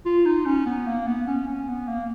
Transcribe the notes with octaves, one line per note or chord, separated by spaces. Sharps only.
F4
D#4
C#4
B3
A#3
B3
C#4
C#4
B3
A#3